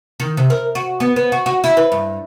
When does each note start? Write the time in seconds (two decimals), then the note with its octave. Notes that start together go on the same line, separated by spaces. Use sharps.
0.20 D#3
0.37 C3
0.50 A#4
0.75 F#4
1.00 B3
1.16 B3
1.32 F#4
1.46 F#4
1.64 E4
1.77 B4
1.92 G2